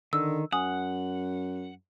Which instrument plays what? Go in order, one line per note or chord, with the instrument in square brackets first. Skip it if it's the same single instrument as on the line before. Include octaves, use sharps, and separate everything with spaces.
[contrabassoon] D3 [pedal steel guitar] D#3 [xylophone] E6
[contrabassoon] F#2 [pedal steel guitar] F#5 [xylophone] G#5 D#6